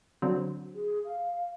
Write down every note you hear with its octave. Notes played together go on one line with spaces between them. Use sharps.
D3 F#3 C4
G#4
F5